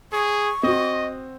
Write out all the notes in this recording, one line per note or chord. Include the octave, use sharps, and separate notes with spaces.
G#4 C#6
C4 F#4 D#5